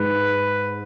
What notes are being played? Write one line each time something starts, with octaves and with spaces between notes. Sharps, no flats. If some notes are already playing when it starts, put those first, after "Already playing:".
Already playing: G#2 G#3 B4